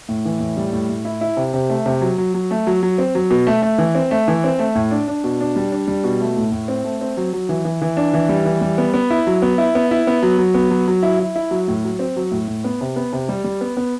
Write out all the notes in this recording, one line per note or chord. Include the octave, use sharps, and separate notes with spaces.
A2
E3
A2
G3
A2
A2
E4
E4
C3
C3
A3
C3
F#3
F#3
F#3
A3
F#3
F#3
C4
F#3
B2
A3
A3
E3
C4
A3
E3
C4
A3
A2
D4
D4
B2
D4
G3
D4
G3
B2
A3
A2
A2
C4
A3
C4
F#3
F#3
E3
E3
E3
D4
E3
G3
E3
G3
B3
B3
E4
F#3
B3
E4
B3
E4
B3
F#3
F#3
B3
F#3
F#3
E4
E4
E4
F#3
A2
F#3
C4
F#3
A2
A2
B3
C3
B3
C3
G3
G3
B3
B3